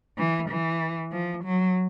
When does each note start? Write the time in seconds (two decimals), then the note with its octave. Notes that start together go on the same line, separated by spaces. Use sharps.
0.18 E3
0.50 E3
1.12 F3
1.44 F#3